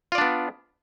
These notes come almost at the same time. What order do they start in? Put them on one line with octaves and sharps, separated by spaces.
F4 D5 D4 B3